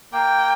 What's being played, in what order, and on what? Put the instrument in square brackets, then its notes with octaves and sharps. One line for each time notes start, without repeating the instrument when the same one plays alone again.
[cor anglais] A#3 [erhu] G5